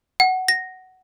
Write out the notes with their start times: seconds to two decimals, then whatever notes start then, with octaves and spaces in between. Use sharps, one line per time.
0.20 F#5
0.48 A#6